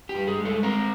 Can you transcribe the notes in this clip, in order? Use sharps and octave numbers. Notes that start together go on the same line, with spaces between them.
G4
G2
G#4
G#3
A4
C4 A#4